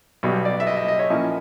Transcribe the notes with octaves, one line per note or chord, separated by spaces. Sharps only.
B1 B2 G3
D5
E5
D#5
D#5
D#5
C#5
A#2 F3 A#3 C#4 E4